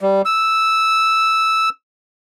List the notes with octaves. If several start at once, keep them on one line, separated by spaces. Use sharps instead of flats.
G3
E6